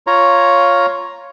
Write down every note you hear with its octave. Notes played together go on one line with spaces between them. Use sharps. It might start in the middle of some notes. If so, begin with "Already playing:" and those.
F4 C#5 A#5